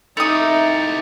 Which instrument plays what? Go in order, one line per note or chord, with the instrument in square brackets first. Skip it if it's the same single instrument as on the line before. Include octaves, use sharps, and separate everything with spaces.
[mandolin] A3 D#6 [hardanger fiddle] D#4 [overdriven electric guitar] E4 G4 [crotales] A6 C#7 F7